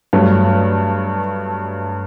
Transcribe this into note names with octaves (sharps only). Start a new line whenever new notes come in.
G2 F#3 A3